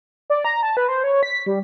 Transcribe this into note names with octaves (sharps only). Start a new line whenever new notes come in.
D5
A#5
A5
B4
C5
C#5
B6
G3